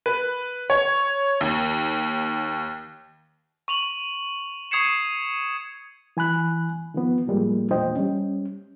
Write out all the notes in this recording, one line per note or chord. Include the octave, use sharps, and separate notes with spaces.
B4
C#5
D#2
C#6 F7 F#7
C#6 D#6 G#6 C7 C#7 E7
E3 G#5 B5 F#6
D#3 F3 B3
A2 F3 G3 G#3 A#3
E2 A#2 D4 C5 D#5 G5
G3 C#4